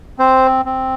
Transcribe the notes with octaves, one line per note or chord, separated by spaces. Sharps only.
C4 C5
C4